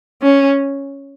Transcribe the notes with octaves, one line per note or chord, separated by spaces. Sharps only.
C#4